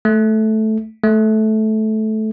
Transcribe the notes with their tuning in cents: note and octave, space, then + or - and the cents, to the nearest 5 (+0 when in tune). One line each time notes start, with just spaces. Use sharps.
A3 -10
A3 -15